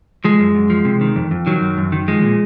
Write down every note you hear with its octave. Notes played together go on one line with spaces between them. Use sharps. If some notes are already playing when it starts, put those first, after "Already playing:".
F3 G#3
F#2
F#2
F3
C3
D#3
F2
F2
D#3 F#3
F#2
F#2
D#3
F3 G#3
A#2